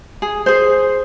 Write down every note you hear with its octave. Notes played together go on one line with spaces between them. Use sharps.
G#4
G#4 C5